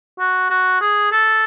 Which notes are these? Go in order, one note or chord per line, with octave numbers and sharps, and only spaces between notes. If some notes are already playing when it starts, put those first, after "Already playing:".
F#4
F#4
G#4
A4